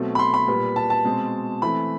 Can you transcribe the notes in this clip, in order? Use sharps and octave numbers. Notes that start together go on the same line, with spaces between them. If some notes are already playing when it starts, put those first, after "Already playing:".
Already playing: B2 F#3 A3 C4
B5
C6
B5
A#2 G3 B3
A5
A5
B2 G#3 C4
E3 A3 C4 B5